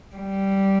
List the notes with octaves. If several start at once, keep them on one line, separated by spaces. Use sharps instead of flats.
G3